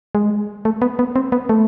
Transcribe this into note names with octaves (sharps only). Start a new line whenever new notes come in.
G#3
A3
B3
B3
C4
B3
A3